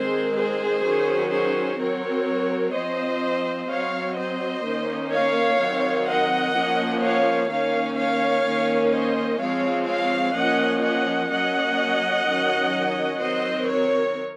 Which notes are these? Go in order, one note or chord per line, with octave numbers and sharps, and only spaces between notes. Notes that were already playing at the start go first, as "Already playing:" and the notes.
Already playing: D#3 G#3 C4 G#4 C5
G#4 C5
D#3 F#3 C#4
G#4 C5
F#3 C4 A#4 C#5
F3 C4 C5 D#5
F#3 C4 C#5 F5
C5 D#5
D#3 A#3 C#4
C#5 F5
D#3 F#3 C4
D#5 F#5
F3 A#3 C#4
C#5 F5
D#3 A#3 C#4 C#5 F5
C#5 F5
D#3 A#3 C#4
C5 D#5
F3 G#3 C4 C#5 F5
C#5 F5
F3 A#3 C#4 D#5 F#5
D#5 F#5
F#3 A#3 C#4 D#5 F#5
D#3 F#3 C#4
D#3 F#3 C4 C5 D#5
A#4 C#5